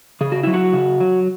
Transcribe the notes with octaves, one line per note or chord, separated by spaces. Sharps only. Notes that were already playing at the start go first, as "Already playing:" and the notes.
C#3 G#4
F#4
F#3 E4
F#4
C#3
F#3